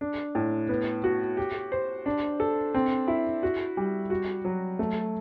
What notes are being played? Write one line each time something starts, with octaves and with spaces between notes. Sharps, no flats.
D4
A2
B3
F#4
G4
C5
D4
A4
C4
E4
F#4
G3
F#4
F#3
A3